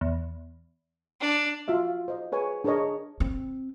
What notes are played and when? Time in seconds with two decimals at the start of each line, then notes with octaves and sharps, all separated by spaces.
0.01 E2
1.21 D4
1.68 F4 F#4 E5 F5
2.08 C5 D#5
2.32 G#4 B4 C#5 G#5
2.64 D4 G#4 A#4 C#5 D#5
3.20 C4